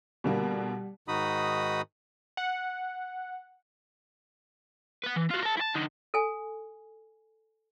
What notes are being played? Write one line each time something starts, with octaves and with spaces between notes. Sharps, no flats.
B2 D3 G3 A#3
G#2 D#3 D#4 F#4 B5 D#6
F#5
B4 F#5
E3
F4 F#4
A#4 A5
E4 A5
D3 D#4
A4 G#5